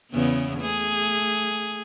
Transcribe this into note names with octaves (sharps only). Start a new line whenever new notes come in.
E2 C#3 B3
A3 G#4